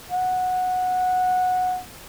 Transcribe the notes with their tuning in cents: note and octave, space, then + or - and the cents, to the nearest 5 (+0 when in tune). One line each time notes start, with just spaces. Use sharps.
F#5 -10